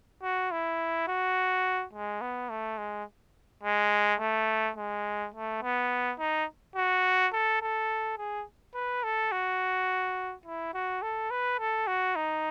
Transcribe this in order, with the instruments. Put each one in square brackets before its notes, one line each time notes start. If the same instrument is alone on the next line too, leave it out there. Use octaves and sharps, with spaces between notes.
[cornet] F#4
E4
F#4
G#3
B3
A3
G#3
G#3
A3
G#3
A3
B3
D#4
F#4
A4
A4
G#4
B4
A4
F#4
E4
F#4
A4
B4
A4
F#4
D#4